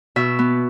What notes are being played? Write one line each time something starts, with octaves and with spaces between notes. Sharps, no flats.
B2 E5
B3